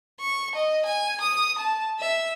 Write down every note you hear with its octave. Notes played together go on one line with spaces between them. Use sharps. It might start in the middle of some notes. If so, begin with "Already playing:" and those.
C#6
D#5
G#5
D#6
A5
E5